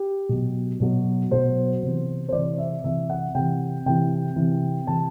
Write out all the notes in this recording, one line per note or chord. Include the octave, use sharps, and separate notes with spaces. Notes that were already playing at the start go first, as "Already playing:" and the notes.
Already playing: G4
B2 F#3
B2 F#3
B2 F#3 C5
C3 E3
C5
C3 E3 D5
E5
C3 E3 E5
F#5
C3 E3 G5
C3 E3 G5
C3 E3
C3 E3 A5